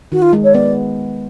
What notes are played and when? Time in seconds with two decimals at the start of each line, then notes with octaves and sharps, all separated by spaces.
0.12 D#3 F#4
0.22 F4
0.33 G#3
0.44 C#5
0.54 B3 D5